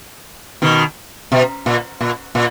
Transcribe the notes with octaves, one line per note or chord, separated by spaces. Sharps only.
B2 D#3
B2
A#2
A#2
A#2